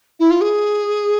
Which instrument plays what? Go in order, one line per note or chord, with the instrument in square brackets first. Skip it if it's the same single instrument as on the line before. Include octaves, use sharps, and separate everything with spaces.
[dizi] E4
F4
G#4